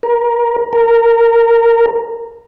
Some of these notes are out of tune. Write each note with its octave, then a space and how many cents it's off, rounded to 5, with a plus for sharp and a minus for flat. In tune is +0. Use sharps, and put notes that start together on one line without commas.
A#4 +25
A#4 -10